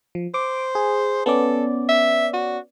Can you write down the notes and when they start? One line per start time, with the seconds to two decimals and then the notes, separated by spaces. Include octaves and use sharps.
0.15 F3
0.34 C5 D6
0.75 G#4
1.26 B3 C#4 A4 D5
1.89 E5
2.34 F#4